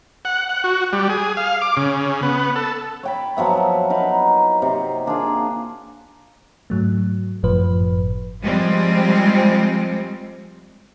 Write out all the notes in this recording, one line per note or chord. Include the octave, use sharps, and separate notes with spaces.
F#5
F#5
F#4
G3
G#4
F5
D6
C#3
B3
A4
C#5 G5 B5
F3 F#3 B3 E5
D#4 A#4 B4 D#5
C3
A#3 D4 F4 G#4
G#2 F#3 A3
G1 F#2 A2 F3 B4
F3 G3 G#3 C4